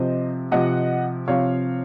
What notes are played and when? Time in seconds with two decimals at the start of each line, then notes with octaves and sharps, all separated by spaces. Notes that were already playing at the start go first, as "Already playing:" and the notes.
Already playing: C3 F3 C4 C5 D#5
0.52 C3 F3 C4 D#5 F#5
1.28 C3 F3 C4 C#5 F5